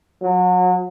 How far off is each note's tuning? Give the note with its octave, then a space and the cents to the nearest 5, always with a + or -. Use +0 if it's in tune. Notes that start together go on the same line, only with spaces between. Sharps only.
F#3 -30